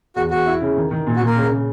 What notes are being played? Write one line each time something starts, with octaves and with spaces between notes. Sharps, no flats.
E2 F#4
E2 F#4
E4
C#3
D#3
D#3
A#2
F#4
A#2 A#3 A#4
C#3
C#3